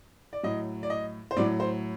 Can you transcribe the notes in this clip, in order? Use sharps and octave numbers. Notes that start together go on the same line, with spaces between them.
D5
A2 F#3 D#5
D5
D#5
C5
A2 F#3 D5
C5